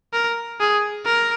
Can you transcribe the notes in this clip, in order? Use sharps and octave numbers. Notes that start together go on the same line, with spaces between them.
A#4
G#4
A#4